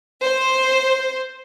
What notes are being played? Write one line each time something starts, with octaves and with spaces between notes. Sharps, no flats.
C5